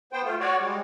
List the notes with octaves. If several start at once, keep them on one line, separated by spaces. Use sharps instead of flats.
B3 C5 G5
A3 F4
F#4 C#5 D5
G3 G#3